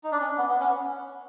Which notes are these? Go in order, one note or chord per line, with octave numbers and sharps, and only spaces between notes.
D#4
D4
C#4
B3
B3
C#4